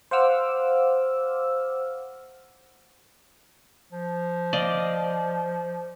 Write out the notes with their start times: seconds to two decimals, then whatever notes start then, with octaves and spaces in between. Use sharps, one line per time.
0.11 C5 F5 F#5 D6 E6 F6
3.92 F3
4.53 D5 D#5 F5